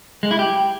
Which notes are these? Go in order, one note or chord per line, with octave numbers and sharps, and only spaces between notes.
G#3
E4
G4